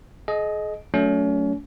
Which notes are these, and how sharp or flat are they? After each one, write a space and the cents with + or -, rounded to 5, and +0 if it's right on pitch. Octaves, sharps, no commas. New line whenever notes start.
G#4 +40 D#5 +0
F#3 -5 A3 +0 C#4 +35